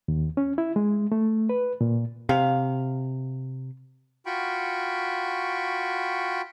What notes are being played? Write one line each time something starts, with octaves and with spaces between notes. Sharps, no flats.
D#2
C#4
E4
G#3
A3
B4
A#2
C3 F5
F4 F#4 G5 B5 C#6